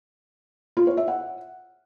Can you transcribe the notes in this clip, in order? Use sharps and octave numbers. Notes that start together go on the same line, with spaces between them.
F4
C#5
E5
F#5